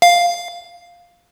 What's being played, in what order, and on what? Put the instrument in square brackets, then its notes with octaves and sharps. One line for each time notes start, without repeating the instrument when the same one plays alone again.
[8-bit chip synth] F5